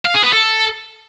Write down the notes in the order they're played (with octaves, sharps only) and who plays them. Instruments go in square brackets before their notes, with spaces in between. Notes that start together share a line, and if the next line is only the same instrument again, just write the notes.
[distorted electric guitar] F5
G#4
B3
A4